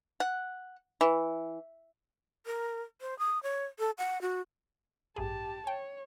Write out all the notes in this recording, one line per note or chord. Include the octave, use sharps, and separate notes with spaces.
F#5
E3
A#4
C5
D#6
C#5
A4
F#5
F#4
A1 G2 G4 G#4 A5
C#5 G5